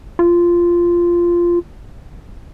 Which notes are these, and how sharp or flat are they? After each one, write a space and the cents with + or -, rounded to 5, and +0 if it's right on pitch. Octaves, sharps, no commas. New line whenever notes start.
F4 -10